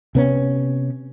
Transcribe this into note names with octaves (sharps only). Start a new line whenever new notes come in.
C3 B3 C#4